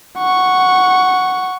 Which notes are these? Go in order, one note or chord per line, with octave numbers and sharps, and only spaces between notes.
F#5 C#6